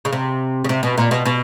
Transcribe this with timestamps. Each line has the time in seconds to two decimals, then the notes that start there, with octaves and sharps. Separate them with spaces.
0.05 C#3
0.13 C3
0.64 C#3
0.69 C3
0.83 B2
0.98 A#2
1.11 B2
1.26 B2